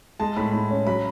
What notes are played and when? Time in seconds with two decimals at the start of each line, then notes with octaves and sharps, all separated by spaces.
0.20 G#3 A5
0.37 A2 B5
0.53 A2
0.70 C#4
0.87 F#3 B5